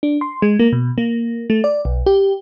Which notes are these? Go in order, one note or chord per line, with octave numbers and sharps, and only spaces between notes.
D4
C6
G#3
A#3
B2
A#3
A3
D5
B1
G4